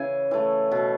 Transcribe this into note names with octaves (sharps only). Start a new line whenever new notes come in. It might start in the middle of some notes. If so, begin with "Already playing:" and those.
Already playing: C#3 E3 E5 G#5
E3 A3
B2